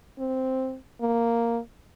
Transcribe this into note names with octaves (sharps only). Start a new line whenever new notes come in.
C4
A#3